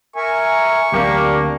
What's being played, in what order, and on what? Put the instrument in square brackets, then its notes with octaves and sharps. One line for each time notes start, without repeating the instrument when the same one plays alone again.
[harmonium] A#4 E5 G#5 [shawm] C#6
[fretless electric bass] D2 F#3 C4 [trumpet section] A#3 G4 [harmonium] D4